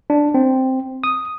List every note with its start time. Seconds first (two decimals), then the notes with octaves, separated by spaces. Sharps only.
0.10 D4
0.34 C4
1.04 D#6